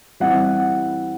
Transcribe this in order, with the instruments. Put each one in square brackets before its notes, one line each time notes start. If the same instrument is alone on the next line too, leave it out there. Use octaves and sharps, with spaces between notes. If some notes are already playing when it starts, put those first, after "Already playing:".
[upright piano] E3 G3 C4 E4 F#5